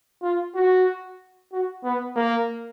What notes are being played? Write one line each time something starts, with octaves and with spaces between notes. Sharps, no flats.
F4
F#4
F#4
B3
A#3